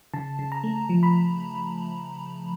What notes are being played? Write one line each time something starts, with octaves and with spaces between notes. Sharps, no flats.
C#3 A5
C#3
A#5
A3
F3
B5